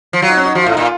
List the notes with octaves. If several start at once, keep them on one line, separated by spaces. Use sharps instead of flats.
F3
F#3 F4
D#4
C#4
D#4
F3 F#4
A2 F4
D#4
A#2 F4